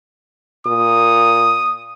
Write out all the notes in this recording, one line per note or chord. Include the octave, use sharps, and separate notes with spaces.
A#2 D#6